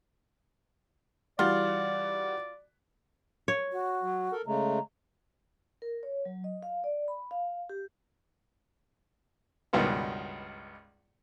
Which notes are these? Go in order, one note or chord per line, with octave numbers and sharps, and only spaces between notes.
E3 G3 F4 F#4 D5
C#5
F#4
F#3
A4 A#4
C#3 G#3 A3 A#5
A#4
C#5
F#3
D#5
F5
D5
B5
F5
G4
C#2 G2 B2 D#3 B3